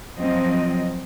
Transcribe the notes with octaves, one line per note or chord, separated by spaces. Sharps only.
F3 F#3 C4 D#5